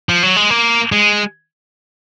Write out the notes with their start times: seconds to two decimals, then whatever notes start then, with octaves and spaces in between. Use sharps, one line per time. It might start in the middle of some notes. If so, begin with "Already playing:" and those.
0.09 F3
0.23 F#3
0.36 G#3
0.50 A#3
0.92 G#3